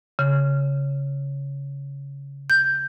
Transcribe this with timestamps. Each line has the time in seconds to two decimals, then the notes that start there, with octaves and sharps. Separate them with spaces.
0.19 C#3
2.50 G6